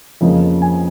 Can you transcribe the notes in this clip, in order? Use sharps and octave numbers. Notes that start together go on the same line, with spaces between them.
F2 C#3 F3 A#3 D#5
G#5